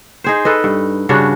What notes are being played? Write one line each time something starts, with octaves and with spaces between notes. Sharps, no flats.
D#4 G#4 C5
A4 B4 D#5
G2
G2 C#3 D4 F#4